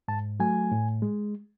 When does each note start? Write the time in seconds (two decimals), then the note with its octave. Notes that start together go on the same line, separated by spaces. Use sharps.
0.08 G#2 A5
0.40 F#3 A3 G#5
0.72 A2
1.02 G#3